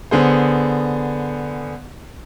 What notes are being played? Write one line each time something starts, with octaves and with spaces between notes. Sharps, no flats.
D3 B3 G#4 C5